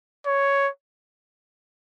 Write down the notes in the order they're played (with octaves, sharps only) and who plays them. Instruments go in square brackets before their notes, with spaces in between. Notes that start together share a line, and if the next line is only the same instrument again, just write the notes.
[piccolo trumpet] C#5